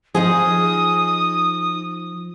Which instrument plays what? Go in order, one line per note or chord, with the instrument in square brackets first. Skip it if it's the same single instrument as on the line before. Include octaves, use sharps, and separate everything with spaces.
[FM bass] F3 [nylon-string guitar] D#4 F4 G#4 [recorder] D#6